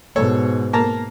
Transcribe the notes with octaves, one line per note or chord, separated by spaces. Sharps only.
G#2 B2 A4 C#5
A#3 A5 A#5